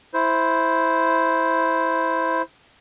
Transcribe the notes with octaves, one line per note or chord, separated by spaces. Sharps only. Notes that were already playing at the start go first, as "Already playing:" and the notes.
E4 C5